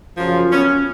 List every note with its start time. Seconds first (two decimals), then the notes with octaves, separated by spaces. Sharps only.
0.16 F#2 C#3 F3
0.51 B3 C#4